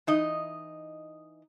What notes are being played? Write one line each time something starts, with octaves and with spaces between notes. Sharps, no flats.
E3 D#4 D#5